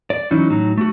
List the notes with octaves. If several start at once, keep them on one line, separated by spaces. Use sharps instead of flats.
D5
E3 F#3 C#4 D#4 E4
A2 F#3 D#4
A3 F#4